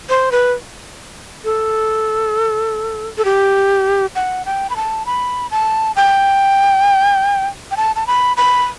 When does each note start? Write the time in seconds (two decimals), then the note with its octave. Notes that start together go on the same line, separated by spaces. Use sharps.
0.09 C5
0.32 B4
1.44 A4
3.18 A4
3.25 G4
4.15 F#5
4.46 G5
4.70 B5
4.76 A5
5.06 B5
5.51 A5
5.96 G5
7.71 G5
7.77 A5
7.96 A5
8.07 B5
8.37 B5